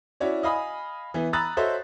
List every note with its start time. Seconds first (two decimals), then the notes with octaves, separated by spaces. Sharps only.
0.20 C#4 E4 F#4 C#5 D5
0.43 D#5 F5 G#5 B5 D#6
1.14 E3 B3
1.33 A#5 B5 D#6 E6 F#6 A6
1.57 F#4 A4 C5 C#5 D#5 E5